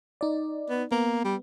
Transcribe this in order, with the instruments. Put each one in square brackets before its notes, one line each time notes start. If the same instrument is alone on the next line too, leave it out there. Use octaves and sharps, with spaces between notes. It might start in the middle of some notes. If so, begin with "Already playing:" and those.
[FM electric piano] D#4 D5
[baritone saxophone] B3
[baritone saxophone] A#3 [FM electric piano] B3
[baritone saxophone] G3